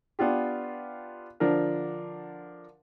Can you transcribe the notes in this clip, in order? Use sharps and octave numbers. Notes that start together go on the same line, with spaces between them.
B3 D4 F4 G4
D3 F3 D4 A#4